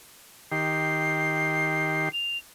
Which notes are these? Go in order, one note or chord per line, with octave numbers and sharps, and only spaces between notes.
D#3 G4 C7
F7